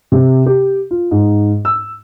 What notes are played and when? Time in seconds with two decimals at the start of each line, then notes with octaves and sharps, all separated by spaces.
0.12 C3
0.46 G4
0.91 F4
1.11 G#2
1.65 E6